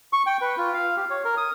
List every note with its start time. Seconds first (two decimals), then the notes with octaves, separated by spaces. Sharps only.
0.13 C#6
0.26 G5
0.41 B4
0.58 F4
0.73 F5
0.97 G4
1.10 C#5
1.25 A#4
1.37 D#6